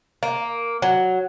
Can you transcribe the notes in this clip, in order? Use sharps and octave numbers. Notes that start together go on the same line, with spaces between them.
A#3
F#3